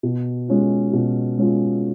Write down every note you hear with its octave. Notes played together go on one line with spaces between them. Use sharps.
B2
G#3 C#4 F4
B2
G#3 C#4 F4